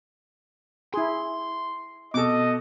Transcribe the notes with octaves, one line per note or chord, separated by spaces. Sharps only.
E4 G#4 C6
B2 A4 D#5 D6